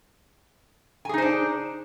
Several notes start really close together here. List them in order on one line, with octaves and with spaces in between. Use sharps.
G#5 G#4 D#4 C5 D4